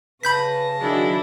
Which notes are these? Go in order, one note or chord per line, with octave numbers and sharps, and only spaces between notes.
C#3 B4 A5 B5 G6 A#6 B6
D#3 F#3 D4 E4 G#4